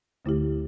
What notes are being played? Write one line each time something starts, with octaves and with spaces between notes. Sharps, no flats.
D2 D3 A3 E4 G4